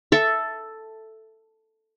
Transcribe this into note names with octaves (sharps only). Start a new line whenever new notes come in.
A4 E5